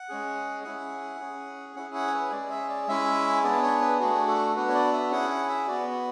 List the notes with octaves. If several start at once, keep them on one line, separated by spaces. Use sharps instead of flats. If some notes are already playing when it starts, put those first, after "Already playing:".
Already playing: F#5
G#3 C#4 G#4
C#4 E4 G#4 F#5
C#4 G#4
C#4 E4 G#4 F#5
F#5
C#5
B4
G#3 C#4 G#4 D5
E5
D5
G#3 C#4 E4 E5
B3 D4 G#4 D5
C#5
B4
A3 D4 F#4 G#4
A4
B3 D4 F#4 B4
C#5
D5
E5
C#4 E4 G#4 F#5
F#5
E5
B3 F#4 D5